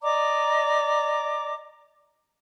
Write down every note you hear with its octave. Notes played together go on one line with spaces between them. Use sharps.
D5 D#5 A#5 D6